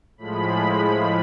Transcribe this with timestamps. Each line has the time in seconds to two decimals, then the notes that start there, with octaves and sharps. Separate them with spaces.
0.18 A2 F3 G#3 B5
0.89 B5